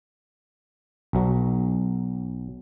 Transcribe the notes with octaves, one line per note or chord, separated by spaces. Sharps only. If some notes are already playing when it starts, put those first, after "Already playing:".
B1 F#3